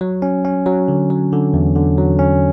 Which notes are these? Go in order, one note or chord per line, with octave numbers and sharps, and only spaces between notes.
F#3
C#4
C#4
F#3
D3
F#3
D3
E2
D3
F#3
C#4